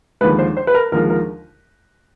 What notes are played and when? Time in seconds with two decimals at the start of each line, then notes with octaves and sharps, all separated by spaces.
0.21 D#2 D3 F3 G#3 B4
0.39 C5
0.57 C5
0.67 B4
0.74 A#4
0.92 D#2 D3 F3 G#3 A#4
1.10 A#4